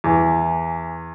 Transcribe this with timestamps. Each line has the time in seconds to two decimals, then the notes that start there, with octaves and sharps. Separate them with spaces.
0.04 E2 E3